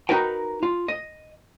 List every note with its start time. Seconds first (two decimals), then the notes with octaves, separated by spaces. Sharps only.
0.09 D#4 F#4 A#4 B4 G5
0.63 F4
0.88 D#5